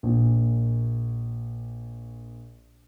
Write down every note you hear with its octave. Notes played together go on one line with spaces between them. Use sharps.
A#1 A#2